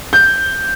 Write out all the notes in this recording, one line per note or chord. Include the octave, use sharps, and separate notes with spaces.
G6